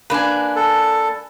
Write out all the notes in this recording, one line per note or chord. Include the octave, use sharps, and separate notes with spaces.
A#3 D4 B4 G#5
A4